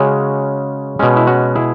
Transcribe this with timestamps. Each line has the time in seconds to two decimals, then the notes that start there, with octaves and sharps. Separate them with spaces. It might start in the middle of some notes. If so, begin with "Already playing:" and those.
Already playing: C#3 G#3 C#4 F#4
0.99 B2 G#3 C#4
1.17 E4
1.27 C#4 F#4
1.55 E4 G#4